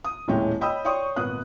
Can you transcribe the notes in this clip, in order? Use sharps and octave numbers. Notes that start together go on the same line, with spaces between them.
D#6
D#1 A2 G#3 E4 C#5 G5
C#5 D#5 G5 B5 D#6 E6
C#5 D5 G5 C6 C#6 D#6
G#1 A#2 B3 D#6 F#6